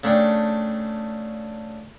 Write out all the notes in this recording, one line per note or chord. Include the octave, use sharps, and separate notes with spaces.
C#3 A3 D4 G5